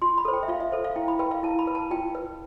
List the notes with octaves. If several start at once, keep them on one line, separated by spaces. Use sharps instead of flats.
F4 C6
B5
A4 C5
G5
E5
F4 F5
E5
A4 C5
F5
E4 G5
B5
B4 G5
F5
E4 A5
B5
B4
A5
F4 G5
B4